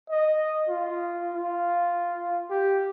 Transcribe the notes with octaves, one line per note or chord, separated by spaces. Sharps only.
D#5
F4
F4
G4